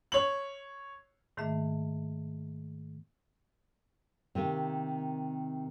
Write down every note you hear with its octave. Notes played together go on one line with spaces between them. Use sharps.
C#5 F#7
G#2 D#3 A3 A#3 E5
C3 D#3 A#3